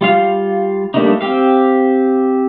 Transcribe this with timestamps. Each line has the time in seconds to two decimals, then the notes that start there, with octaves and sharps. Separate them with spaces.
0.01 G3 F4 F5
0.94 G3 A3 A#3 D4 D#4
1.21 C4 G4 F5